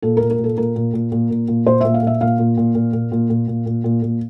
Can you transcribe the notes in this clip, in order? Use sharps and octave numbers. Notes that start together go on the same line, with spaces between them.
A#2 A4
A#2 A#4
A#4
A#2 A4
A#2 A#4
A#2
A#2
A#2
A#2
A#2
A#2 C5
A#2 E5
F5
A#2 E5
A#2 F5
A#2
A#2
A#2
A#2
A#2
A#2
A#2
A#2
A#2
A#2